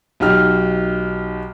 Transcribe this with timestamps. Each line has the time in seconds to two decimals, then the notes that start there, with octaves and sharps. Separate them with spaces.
0.20 B1 D#4 G4 F6